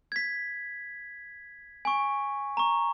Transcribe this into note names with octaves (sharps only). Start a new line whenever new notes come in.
G#6 B6
G#5 C#6
A#5 C#6